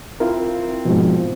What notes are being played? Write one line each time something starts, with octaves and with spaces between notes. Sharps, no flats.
C4 E4 F4 A#4
G#2 B2 F3